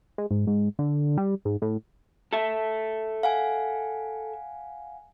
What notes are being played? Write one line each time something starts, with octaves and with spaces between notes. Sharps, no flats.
G#3
G#2
G#2
D3
G3
G#2
A2
A4 E5
F5 F#5 G#5